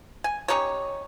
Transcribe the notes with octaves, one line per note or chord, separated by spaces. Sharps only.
G#5
C#4 D#4 G4 C#5